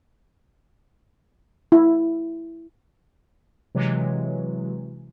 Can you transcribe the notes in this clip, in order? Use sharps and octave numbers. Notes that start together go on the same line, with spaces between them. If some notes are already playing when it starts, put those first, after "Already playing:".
E4
C3 E3 F#3 G#3